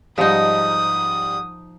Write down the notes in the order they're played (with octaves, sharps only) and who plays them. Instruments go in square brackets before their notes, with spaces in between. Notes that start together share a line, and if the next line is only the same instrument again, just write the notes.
[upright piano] G#2 G3 [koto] F3 D#4 [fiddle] D#6